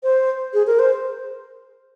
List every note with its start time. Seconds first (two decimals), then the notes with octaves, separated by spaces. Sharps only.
0.03 C5
0.54 G#4
0.67 A#4
0.79 C5